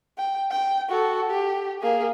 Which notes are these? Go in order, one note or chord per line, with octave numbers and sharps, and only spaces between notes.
G5
G5
F#4 A4
G4
A#3 G#4